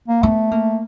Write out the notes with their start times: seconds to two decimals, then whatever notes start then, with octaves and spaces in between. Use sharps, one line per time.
0.08 A#3
0.23 A3 B3
0.51 A#3